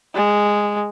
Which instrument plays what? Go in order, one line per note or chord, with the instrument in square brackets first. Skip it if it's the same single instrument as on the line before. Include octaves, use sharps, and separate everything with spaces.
[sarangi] G#3